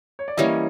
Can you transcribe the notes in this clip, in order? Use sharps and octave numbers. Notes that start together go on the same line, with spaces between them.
C#5
D5
E3 G3 A#3 C#4 C#5 D#5